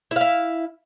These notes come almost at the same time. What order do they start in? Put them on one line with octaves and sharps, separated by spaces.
E4 F5 E5